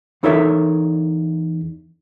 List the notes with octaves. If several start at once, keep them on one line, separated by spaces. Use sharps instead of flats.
E2 D#4 A4 A#4 C#5 E5